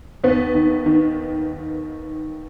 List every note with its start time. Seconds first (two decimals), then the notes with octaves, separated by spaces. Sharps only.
0.24 D#2 B3
0.55 D#3
0.86 D#3